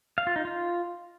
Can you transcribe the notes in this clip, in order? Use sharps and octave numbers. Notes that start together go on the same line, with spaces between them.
F5
F4
D#4
F4